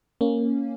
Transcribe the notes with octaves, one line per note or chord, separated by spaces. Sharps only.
A#3 C#4